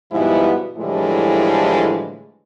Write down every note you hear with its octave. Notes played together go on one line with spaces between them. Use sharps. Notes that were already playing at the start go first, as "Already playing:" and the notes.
G#2 B2 F3 G3 B3 E4
A2 D3 E3 F3 G3 G#3